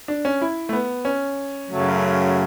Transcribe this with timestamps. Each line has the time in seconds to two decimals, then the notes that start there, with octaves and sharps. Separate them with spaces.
0.08 D4
0.25 C#4
0.41 E4
0.69 A3
0.73 B3
1.05 C#4
1.69 F#2 C#3 F#3 A3